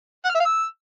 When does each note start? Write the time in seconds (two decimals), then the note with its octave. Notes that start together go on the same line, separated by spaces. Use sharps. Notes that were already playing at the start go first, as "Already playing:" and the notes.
0.25 F#5
0.30 F6
0.35 E5
0.40 F5
0.45 E6